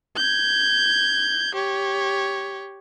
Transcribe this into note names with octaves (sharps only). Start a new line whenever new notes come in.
G6 G#6
G4 C#5